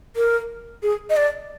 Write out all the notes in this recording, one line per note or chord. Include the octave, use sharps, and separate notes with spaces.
A#4
G#4
D#5
D5